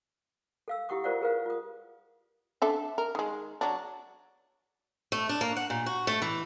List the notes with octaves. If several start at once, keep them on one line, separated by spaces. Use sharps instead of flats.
A4 F5 E6
E4 G4 F#5 C#6 D#6
F4 A#4 C5 D5 F5 F#5
G#4 A#4 B4 F5
F4 D#6
D4 A4 E5
A#4
D#3 G#3
F#3 D4
A3
D4
A#3
F#5
A#2
F#4
A3
E3